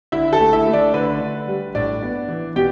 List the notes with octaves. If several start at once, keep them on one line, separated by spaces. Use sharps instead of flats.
D3 E4 E5
A4 A5
A3
E4 E5
A3
D4 D5
D3 B4
D3
G3
A2 D4 D5
B3
E3
B2 G4 G5